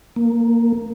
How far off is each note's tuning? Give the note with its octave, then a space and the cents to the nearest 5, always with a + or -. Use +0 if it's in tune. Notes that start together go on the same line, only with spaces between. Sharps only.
A#3 -5